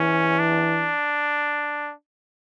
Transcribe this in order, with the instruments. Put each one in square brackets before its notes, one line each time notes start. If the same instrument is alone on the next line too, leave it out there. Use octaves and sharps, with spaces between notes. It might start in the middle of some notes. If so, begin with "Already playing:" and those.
Already playing: [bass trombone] E3 [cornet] C#4
[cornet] D4